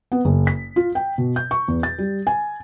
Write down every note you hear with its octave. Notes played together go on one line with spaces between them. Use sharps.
B3
F#1
B6
F4
G5
B2
G6
C#6
E2
A6
G3
G#5